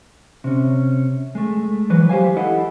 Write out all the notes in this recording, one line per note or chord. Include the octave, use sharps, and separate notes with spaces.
C3 C#4
G#3 A3
E3 F#3 B4
G4 C5 F5 G#5
E4 G4 A4 D#5 F#5